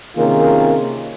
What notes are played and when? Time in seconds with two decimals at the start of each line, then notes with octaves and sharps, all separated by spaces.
0.16 C3 D#3 A#3 C#4 F4 G#4